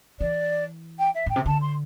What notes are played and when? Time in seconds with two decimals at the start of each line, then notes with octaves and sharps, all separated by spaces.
0.20 E3 D5
0.99 G5
1.15 E5
1.26 A2 G5
1.36 C3
1.46 D3 A5
1.61 C6